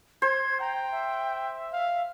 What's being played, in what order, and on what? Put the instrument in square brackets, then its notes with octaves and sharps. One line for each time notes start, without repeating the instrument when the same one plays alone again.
[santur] C5 [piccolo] G#6
[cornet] G5 [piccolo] A#5
[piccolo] E5
[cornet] F5